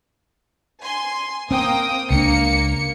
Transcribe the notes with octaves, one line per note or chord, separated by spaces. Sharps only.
G#5 C6
A#3 C4 G5 D#6
C#2 A#3 D4 C#7